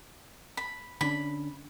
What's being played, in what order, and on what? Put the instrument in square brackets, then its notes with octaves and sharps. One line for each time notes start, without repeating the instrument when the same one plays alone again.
[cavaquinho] B5
[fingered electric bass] D3 C#4 D4 [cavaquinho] B5